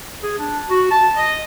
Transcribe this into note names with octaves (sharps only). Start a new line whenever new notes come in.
G#4
D4
F#4
A5
D#5